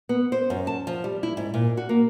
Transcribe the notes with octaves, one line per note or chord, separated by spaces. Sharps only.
B3
C5
F#2
A5
F3
G3
E4
G#2
A#2
F#4
A#3